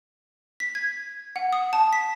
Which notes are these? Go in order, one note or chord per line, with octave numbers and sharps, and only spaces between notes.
B6
G#6
F#5
D#6
A5
B6